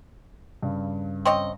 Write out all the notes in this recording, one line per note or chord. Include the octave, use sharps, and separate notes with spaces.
G2 C#3
C4 C#5 D#5